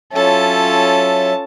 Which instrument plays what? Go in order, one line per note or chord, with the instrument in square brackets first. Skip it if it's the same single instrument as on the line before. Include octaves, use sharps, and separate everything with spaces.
[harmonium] F#3 E5 [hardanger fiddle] C#4 A5 [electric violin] F4 A4